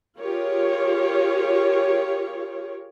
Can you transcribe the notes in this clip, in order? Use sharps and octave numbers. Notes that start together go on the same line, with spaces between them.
F4 G4 G#4 A#4 C#5